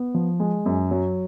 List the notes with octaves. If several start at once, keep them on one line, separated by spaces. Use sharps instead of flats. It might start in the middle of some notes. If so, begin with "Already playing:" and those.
Already playing: B3
F3
G#3
F#2
F#3